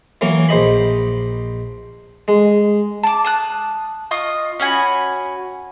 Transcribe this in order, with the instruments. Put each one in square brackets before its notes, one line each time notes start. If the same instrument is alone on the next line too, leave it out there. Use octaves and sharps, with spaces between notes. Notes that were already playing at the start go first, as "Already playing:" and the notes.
[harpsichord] E3 F#3 A#3
A#1 C5 D#5 B5
G#3
[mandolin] A5 D6
A5 D#6 F#6
F4 D#5 C#6 D#6
C#4 F#4 G#5 B5